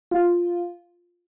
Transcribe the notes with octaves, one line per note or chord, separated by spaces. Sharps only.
F4